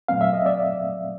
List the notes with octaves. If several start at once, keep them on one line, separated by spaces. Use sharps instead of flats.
A#2 F#3 A3 C4 F5
E5
D#5
D5 E5